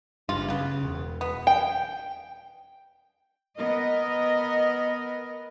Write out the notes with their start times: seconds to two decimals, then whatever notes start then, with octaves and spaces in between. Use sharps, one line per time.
0.29 F#1 G2 F4
0.50 C#3 B3
0.83 E1
1.21 B3
1.47 G5
3.57 B3 A#4 D#5